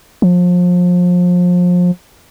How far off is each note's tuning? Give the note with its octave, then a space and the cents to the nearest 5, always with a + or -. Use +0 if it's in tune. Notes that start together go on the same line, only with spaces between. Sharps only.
F3 +30